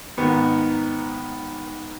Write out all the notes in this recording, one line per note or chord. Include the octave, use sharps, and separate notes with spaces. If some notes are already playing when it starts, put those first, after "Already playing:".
G#2 D#3 B3 D#4